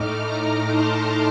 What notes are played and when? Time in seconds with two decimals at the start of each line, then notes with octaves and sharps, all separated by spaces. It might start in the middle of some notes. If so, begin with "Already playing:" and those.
Already playing: A2 A3 D#4 D6 F6
0.17 A#5 D6
0.65 A5 C6